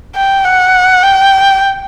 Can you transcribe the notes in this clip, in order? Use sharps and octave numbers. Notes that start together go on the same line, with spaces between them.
G5
F#5
G5